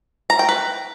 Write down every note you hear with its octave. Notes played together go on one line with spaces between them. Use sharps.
A#5
G5
B4